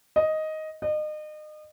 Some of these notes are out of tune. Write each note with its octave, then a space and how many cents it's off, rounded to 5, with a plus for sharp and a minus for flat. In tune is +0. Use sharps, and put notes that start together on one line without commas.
D#5 +5
D#5 -35